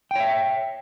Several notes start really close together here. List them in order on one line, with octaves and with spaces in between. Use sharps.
G5 C#5 E5